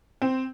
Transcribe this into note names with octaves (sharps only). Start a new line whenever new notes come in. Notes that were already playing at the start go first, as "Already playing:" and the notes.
C4